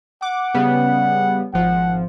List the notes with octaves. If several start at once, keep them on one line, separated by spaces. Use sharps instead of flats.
F#5 D6
C#3 G3 B3
G#1 F3 F#5